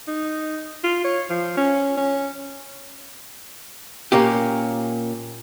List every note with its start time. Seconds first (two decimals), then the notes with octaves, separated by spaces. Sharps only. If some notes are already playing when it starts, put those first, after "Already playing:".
0.08 D#4
0.84 F4
1.04 C#5
1.30 F3
1.58 C#4
1.97 C#4
4.12 A#2 A#3 C#4 G4